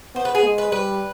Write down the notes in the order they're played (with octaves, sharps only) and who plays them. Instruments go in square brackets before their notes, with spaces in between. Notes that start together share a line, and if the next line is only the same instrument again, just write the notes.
[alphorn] B3 [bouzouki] C5
[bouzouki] B4
G#4
[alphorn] G#3
[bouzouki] B4
[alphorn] G3 [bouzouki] B4